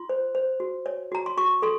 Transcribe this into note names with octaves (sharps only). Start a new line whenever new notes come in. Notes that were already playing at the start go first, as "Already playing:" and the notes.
Already playing: F4 C6
C5
C5
F#4
C#5
F#4 A#5
C6
F#4 C#6
A4 C6